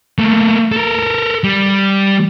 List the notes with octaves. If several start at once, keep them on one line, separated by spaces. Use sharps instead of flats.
A3 A#3
A4 A#4
G3